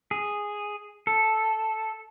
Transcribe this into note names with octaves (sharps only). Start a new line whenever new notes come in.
G#4
A4